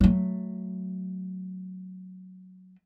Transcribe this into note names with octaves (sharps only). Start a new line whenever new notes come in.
F#3 A3